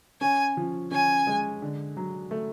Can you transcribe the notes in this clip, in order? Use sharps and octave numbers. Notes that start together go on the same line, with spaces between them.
C#4 G#5
F3
C#4 G#5
G#3
D3
F#3
A3